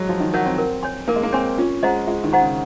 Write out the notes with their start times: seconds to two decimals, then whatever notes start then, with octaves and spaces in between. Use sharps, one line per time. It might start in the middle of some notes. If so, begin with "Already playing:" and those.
Already playing: F#3 G#3
0.09 F3 F#4
0.20 D#3
0.33 F#3 A#4 C#5 F#5
0.46 C4
0.58 A#4
0.83 C#5 G#5 C6
1.08 A#3 A#4
1.16 G#3
1.23 A#3
1.33 C4 C#5 G#5 C6
1.58 C#4 F4
1.83 G#3 C5 D#5 F#5 A#5
2.07 G#3 F4
2.24 D#3
2.33 C5 D#5 F#5 A#5
2.41 C#3